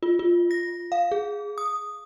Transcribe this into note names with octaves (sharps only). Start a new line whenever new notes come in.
F4
F4
A#6
F5
G#4
D#6